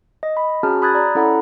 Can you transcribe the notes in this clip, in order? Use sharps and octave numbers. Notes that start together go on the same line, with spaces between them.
D#5
B5
C#4 F#4 G#4 A5 A#5 F6
B5 D#6 F#6 G#6 A6
D5 A#5
C#4 E4 A4 F#5 A#5 B5